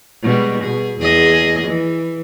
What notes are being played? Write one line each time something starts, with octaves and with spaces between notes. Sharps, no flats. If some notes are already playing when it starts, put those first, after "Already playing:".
B2 G3 G#3
B2 G#4
E2 G#4 D#5
E3